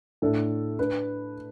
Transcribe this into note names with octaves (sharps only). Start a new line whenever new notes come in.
A2 A3 D4 A4
D4 B4